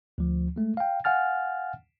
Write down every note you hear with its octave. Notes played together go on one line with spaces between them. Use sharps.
D2 F3
G#3 A3
F5 G5
F5 F#5 G#5 F6 A6